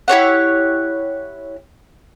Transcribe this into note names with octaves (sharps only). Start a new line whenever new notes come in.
E4 G4 C#5 F#5